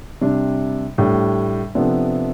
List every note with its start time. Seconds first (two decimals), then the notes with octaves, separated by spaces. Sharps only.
0.22 C3 G3 D4
0.98 A2 G3 D4 G4
1.75 C3 F3 B3 D4 A4